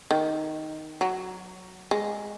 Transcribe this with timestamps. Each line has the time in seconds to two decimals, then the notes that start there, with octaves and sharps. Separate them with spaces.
0.11 D#3
1.01 F#3
1.91 G#3